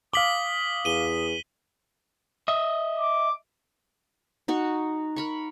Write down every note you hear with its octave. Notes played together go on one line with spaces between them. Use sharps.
F5 D6 D#6 B6 F#7 G7
E2 D#7 G7
D#5 E5
D6
D#4 F#4 C#6
A#4 B5 C#6